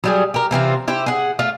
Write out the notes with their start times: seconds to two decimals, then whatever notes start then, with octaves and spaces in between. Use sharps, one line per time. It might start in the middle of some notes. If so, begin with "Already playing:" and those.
0.04 F#3 G3 G#4
0.34 G4 A#4
0.51 C3 E3 C4 F4
0.88 E4 G4 C5
1.06 G#4 F#5
1.39 A3 F4